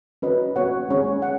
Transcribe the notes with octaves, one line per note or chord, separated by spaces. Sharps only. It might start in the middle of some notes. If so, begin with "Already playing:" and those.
C#4 F#4 B4 D#5
B3 F#4 C#5 F#5
G#3 C#4 G#4 C#5
F#5